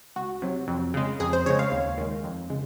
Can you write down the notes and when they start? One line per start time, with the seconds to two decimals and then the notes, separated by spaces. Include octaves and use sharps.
0.16 C#2 F#4
0.42 C3 F#3
0.68 F2
0.94 C#3 G#3
1.20 F2 G#4
1.33 C5
1.46 C#3 G#3 C#5
1.59 F5
1.72 D#2
1.98 D#3 G#3
2.24 F2
2.50 C#3 G#3